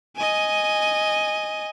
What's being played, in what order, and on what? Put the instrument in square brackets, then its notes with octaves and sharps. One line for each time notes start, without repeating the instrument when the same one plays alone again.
[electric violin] D#5 G#5